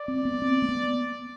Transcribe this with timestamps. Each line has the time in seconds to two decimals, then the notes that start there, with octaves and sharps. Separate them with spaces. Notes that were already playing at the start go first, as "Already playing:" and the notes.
Already playing: D5
0.08 C4
0.25 B3
0.42 C4
0.62 A#3
0.69 B3